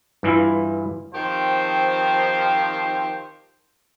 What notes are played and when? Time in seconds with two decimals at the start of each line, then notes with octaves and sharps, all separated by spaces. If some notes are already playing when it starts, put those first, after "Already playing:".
0.23 G2 E3 E4 F4
1.13 D#3 F3 C4 G4 C5